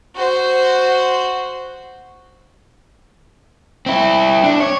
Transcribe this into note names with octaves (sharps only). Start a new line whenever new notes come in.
F#4 C5
C4 E4
D4
C#5